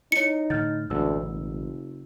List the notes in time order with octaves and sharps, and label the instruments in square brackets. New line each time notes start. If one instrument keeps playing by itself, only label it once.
[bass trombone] D#4 [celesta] E4 C#5 [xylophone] C#7
[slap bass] A2 D3 [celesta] F6 G6 A6
[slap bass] A1 B2 G#3 [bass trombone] D2 [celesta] E6
[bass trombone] F#1